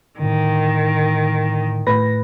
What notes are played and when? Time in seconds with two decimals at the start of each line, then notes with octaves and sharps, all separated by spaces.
0.19 A2 D3 D#3
1.87 A2 B4 A#6